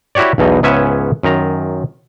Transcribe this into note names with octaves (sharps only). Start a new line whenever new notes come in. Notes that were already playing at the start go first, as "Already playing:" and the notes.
E4 F#4 G4 C#5 D5
B1 E2 B2 D#4
C#2 G#2 B3 C#4 E5 G#5
F#2 D#3 A#5